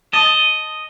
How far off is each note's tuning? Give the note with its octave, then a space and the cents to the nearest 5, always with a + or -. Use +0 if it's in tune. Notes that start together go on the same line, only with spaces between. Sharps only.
D#5 +0 A5 +0